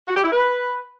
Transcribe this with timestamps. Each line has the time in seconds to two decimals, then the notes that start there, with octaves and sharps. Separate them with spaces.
0.08 F#4
0.16 G4
0.24 E4
0.32 B4